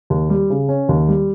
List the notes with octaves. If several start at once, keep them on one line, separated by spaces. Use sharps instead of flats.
D#2
G3
C#3
C#4
D#2
G3